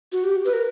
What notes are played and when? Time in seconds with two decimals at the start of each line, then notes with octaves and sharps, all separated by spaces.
0.12 F#4
0.24 G4
0.45 B4
0.53 A#4